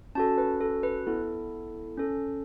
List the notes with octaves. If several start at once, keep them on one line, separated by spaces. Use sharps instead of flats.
C#4 F#4 A4 A5
B4
A4
B4
B3 E4 A4
C#4 A4